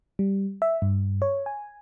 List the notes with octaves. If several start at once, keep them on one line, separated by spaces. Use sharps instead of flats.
G3
E5
G2
C#5
G#5